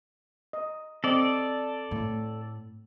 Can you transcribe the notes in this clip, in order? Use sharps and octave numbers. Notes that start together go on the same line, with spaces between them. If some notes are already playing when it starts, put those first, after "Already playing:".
D#5
C4 A4 D5 D#5
A2